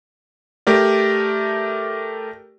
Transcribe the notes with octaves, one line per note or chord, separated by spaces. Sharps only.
A3 G4 A#4 D5